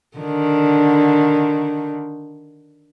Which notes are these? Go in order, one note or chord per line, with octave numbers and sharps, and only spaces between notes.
D3 D#3